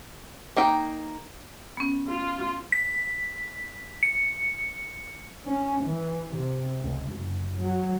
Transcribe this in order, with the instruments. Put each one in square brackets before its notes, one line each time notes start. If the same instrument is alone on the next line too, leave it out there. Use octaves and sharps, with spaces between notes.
[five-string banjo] A#3 D#4 G5
[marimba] B3 C#4
[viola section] F4
[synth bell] B6
C#7
[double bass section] C#4
E3
C3
C#2
F#1
F#3